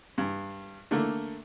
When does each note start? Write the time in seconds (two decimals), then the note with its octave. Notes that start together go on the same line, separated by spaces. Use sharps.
0.18 G2
0.91 D3 A3 A#3